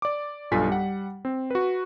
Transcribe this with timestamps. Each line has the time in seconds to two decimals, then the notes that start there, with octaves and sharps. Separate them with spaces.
0.02 D5 D6
0.51 B1 G2 F4 A4 G#5 B6
0.69 G3 F#5
1.25 C4
1.51 F#4 B4